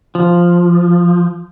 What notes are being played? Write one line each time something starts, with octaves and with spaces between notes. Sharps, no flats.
F3